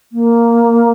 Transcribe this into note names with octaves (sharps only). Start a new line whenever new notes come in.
A#3